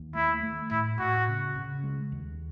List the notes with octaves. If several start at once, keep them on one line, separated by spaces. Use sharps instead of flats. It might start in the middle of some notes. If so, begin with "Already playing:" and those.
Already playing: D#2
A3 E4
A3
A2 E4
A2 F#4
C#3
C#3
G#3
D#2